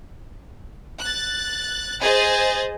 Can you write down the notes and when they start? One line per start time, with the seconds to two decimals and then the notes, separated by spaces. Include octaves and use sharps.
1.00 F#6 A6
2.02 G#4 C5 D#5 A6